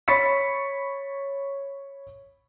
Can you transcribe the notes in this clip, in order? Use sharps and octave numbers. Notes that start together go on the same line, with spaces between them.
C#5 B5 C#6 A6 B6 C#7